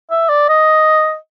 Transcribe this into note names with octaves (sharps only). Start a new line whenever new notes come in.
E5
D5
D#5